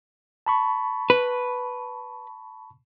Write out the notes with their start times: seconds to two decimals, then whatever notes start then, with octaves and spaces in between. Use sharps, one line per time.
0.46 A5 B5 C#6
1.10 B4